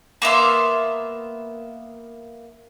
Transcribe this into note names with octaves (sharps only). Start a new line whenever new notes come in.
A#3 B3 E5 C6